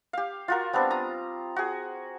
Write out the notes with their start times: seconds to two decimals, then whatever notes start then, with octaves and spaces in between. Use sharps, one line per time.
0.13 G4 F5
0.48 F4 F#4 A#4
0.73 G3 B3 C4 D4
0.91 A#5 D#6
1.56 F#4 G#4